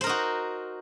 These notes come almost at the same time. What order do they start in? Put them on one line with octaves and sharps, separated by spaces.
C5 A#4 D#4 F#4